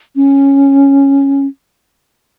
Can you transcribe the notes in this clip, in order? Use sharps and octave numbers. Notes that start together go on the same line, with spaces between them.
C#4